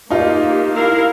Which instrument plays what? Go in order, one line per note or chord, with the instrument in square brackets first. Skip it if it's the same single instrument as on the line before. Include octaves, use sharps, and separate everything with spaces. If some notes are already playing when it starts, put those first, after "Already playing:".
[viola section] A#3 G4 [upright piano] D#4 F4
[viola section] E4 A#4 F5